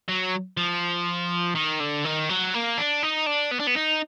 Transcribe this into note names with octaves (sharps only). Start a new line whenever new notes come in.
F#3
F3
D#3
D3
D#3
F#3
A#3
D4
D#4
D4
B3
D4
B3
D#4